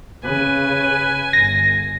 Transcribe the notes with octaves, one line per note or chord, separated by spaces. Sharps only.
C#3 B4 G#5
G1 A#6